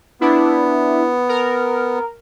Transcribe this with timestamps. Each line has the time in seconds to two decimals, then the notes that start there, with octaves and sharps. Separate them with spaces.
0.21 B3 D4 E4
1.29 A#4